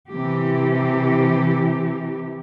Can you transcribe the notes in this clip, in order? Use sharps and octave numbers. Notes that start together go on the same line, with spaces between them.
C3 E3 G4